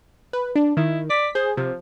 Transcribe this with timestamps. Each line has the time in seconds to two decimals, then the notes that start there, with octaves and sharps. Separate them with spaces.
0.33 B4
0.56 D4
0.77 D#3 E4
1.10 D5 B6
1.35 G#4 C5
1.57 C3 F3